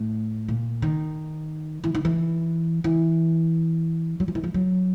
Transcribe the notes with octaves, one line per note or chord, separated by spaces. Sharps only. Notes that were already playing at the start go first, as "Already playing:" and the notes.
Already playing: A2
A#2
D#3
E3
D#3
E3
E3
F#3
F3
E3
F3
F#3